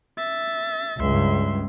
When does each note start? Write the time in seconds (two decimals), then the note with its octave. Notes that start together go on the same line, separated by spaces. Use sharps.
0.17 E5 A6
0.99 C#2 G2 E5 C6